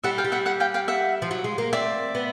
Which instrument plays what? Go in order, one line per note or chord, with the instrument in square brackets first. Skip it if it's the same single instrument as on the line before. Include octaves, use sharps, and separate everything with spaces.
[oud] G3 [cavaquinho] E5 F#5
[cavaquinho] F5 G5
[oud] G3
[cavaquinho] E5 F#5
E5 F#5
F5 G5
F5 G5
E5 F#5
[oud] F3
F#3
G#3
A#3
[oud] C4 [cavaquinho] D5 E5
[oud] B3